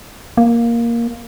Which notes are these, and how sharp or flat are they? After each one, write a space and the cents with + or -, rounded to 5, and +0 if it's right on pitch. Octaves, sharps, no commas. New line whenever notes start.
A#3 +5